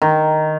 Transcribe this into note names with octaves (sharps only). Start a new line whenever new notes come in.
D#3